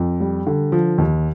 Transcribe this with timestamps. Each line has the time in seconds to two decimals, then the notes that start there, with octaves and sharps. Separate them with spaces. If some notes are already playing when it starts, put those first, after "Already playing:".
Already playing: F2
0.20 G3
0.47 D3
0.72 F3
0.98 D#2